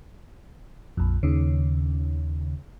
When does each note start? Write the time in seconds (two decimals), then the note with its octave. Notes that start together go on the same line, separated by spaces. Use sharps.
0.97 A#1 F2
1.23 D#2 C#3